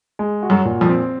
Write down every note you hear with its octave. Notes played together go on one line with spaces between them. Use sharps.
G#3
F#4
F#2 F#3
A#2
F2 F3
C4